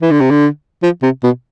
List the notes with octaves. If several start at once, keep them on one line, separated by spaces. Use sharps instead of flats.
E3
D3
C3
D3
F3
C3
B2